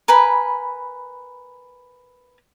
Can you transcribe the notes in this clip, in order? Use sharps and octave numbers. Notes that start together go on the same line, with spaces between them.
A#4 B4 G#5 B5